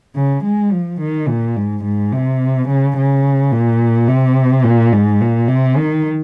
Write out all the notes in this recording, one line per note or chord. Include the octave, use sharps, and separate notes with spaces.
C#3
G#3
F3
D#3
A#2
G#2
G#2
C3
C#3
C#3
A#2
C3
A#2
G#2
A#2
C3
D#3